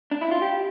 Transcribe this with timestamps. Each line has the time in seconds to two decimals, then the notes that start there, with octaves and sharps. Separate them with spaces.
0.11 D4
0.21 E4
0.31 F4
0.42 G4